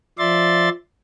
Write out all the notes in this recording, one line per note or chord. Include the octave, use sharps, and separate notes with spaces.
F3 D5 E5 C6 A6